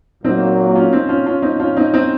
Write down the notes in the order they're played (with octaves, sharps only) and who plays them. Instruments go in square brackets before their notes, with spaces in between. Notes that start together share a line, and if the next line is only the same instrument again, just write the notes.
[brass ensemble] A#2 F#3 A#3 [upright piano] C4 D#4
[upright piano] C#4 F4
C4 D#4
C#4 F4
C#4 F4
C4 D#4
C#4 F4
C4 D#4
C4 D#4